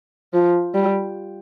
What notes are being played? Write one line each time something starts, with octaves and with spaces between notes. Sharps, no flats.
F3
G3